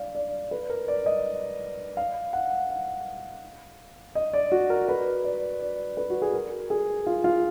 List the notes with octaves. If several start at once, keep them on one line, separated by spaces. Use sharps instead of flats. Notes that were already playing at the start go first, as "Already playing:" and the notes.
Already playing: D5 F5
D5
B4
A#4
D5
D#5
F5
F#5
F5
D#5
D5
F#4
A#4
B4
D5
D5
B4
F#4
G#4
A#4
G#4
F4
F4